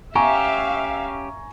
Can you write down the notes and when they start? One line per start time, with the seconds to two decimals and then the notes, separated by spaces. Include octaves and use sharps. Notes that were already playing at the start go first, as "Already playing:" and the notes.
0.15 C#4 G4 E5 F5 G#5 A#5 C#6